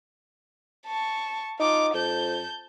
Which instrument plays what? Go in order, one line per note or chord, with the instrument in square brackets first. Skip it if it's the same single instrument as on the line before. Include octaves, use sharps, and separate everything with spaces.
[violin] A5 C#6
[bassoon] D#4 [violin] F4 D6
[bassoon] F2 [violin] A5 G6